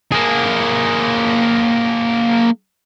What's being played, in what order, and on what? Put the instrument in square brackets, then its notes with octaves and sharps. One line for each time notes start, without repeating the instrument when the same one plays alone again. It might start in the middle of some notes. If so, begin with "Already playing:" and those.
[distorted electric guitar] A#3 G#4